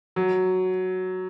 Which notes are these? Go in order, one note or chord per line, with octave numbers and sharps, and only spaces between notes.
F#3